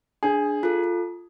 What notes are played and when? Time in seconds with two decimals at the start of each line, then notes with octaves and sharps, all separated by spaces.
0.23 D4 G#4
0.63 F4 A4